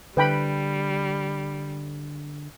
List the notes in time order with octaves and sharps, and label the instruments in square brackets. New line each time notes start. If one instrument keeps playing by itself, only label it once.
[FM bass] D3 [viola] G3 [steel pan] B4 G5 B5